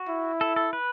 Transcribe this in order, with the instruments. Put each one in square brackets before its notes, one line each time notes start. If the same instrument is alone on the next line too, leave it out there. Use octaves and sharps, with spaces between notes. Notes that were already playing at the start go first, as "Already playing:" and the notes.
Already playing: [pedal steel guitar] F#4
[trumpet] E4
[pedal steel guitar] A4
A4
B4